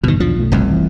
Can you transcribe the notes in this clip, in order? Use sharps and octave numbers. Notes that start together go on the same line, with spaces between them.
G1 E2 B2 D#3
B1 E2 F3 D4
B1 F#2 A3
F1 C2 F2
E3